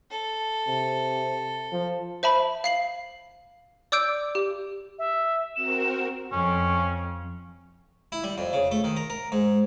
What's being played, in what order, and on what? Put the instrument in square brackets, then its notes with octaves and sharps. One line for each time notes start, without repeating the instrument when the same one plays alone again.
[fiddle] A4
[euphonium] C3
F3
[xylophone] C5 E5 A5 B5
F5 C7 F#7
D5 D6 E6 G6 D7
G4
[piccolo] E5
[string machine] C4 F#4 A#4 [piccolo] E7
[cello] F2 [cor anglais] C#4
[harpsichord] E4
G3
F2
C#3
A3
D#3
A#4
A#4
G#2